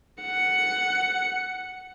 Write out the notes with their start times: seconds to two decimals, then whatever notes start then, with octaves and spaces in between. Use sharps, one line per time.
0.22 F#5 C#7